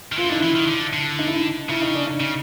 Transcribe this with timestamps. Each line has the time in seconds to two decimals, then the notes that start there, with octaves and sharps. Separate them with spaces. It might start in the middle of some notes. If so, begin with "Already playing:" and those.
0.12 D#3
0.17 E3 F4
0.24 E4
0.29 D3 D#4
0.39 E3 E4
0.55 D#3
0.68 D3
0.93 D3
1.19 D#4
1.27 E4
1.35 D#4
1.69 C#3 E4
1.82 D#4
1.95 D4
2.07 D#4
2.20 C#3